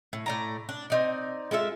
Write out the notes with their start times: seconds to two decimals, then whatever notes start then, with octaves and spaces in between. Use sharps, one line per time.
0.13 A2
0.26 A2 D5 A#5
0.69 D4
0.90 C4 D#4 D5
1.51 G#3 F4 A4 E5